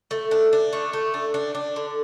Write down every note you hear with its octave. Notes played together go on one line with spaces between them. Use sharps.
A3
D4
D4
A3
A3
D4
D4
D4
D3